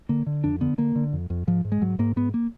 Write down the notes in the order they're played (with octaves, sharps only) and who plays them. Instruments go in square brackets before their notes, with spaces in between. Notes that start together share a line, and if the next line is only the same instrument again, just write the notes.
[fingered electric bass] D3 A#3
D3
F2 D4
D3 B3
D3 A#3
D3
F2
F2
G#2 F3
G#2
G#3
G#2 F#3
G#2 A#3
G#2 B3
A#3